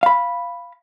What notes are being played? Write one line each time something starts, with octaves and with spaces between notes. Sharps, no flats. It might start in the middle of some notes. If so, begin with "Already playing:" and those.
F5 B5